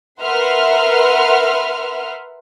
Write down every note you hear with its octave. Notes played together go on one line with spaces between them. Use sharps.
A#4 B4 E5 F#5 C6 F6